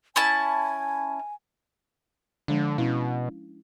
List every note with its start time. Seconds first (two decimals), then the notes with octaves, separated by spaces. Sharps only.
0.16 C#4 E4 G#5 A5
2.48 D3 F3 G#3 D4
2.78 B2 C#4 E4 F5